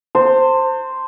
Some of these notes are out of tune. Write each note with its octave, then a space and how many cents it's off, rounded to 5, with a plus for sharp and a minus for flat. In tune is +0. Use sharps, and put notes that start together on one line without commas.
C5 +0 A5 +40